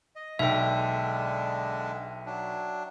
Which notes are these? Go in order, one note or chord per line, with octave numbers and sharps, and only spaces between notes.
D#5
B1 D3 G#3 D4 E5 G5
F#3 D4